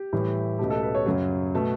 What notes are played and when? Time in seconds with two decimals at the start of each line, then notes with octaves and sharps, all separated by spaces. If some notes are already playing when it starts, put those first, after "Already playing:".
Already playing: G4
0.13 A2 E3 G3
0.59 C#2 B2 A3 G4
0.70 A4
0.83 B4
0.95 C#5
1.06 F#2 C#3 F#3
1.54 B2 A3